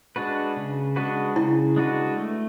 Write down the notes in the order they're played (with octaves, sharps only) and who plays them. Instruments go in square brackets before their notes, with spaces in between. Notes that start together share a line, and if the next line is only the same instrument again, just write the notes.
[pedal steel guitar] G#3 D4 F#4 B4
C#3
G#3 D4 F#4 B4
[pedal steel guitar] C#3 [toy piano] E4
[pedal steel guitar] G#3 D4 F#4 B4
A3